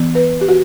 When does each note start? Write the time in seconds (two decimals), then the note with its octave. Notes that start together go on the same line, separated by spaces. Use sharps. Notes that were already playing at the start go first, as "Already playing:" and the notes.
Already playing: E3 B3
0.15 B4
0.41 G4
0.48 F#4